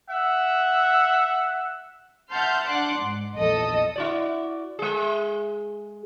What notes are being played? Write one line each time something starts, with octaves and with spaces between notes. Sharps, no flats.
E5 F#5
E5 F#5 A5 C6 F6 G6
D4 F#5 C6 D6 F#6
G#2
A#1 E2 A4 D#5 D#6
E4 F#4 D5
G#3 G#4